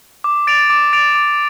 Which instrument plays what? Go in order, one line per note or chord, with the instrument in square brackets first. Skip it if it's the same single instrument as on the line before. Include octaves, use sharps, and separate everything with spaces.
[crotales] D6
A6 D7 F7
D6
A6 D7 F7
D6